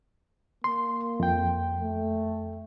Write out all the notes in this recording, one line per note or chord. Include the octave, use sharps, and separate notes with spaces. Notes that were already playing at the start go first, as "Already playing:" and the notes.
A#3 C6
F2 G5
A3